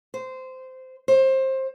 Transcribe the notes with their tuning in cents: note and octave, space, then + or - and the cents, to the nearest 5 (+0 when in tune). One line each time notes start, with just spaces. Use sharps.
C5 -15
C5 +20